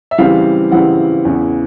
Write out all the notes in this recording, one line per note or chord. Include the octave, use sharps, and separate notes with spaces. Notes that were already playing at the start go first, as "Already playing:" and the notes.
E5
C#3 E3 G3 C4 E4 F5
C#3 E3 G3 C4 E4 F#5
E2 C#3 E3